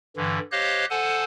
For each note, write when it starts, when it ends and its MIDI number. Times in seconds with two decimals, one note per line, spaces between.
0.17 0.39 43
0.17 0.39 50
0.17 0.39 52
0.52 0.85 67
0.52 0.85 72
0.52 0.85 73
0.52 0.85 75
0.52 0.85 77
0.52 0.85 90
0.90 1.24 69
0.90 1.24 72
0.90 1.24 78
0.90 1.24 80
0.90 1.24 81